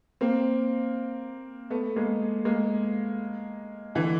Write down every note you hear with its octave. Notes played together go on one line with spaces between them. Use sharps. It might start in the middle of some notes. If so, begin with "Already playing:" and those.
A#3 C4
A3 B3
G#3 A#3
G#3 A#3
D3 E3